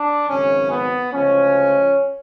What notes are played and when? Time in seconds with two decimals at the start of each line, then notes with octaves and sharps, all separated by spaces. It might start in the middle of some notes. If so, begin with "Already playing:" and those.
Already playing: D4
0.28 G#1 F#2 C#3 C#4
0.71 B3
1.13 D2 C#3 F3 G#3 C#4